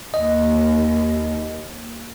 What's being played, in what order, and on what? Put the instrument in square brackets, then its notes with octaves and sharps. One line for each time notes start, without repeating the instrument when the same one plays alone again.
[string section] D#2 [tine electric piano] D#5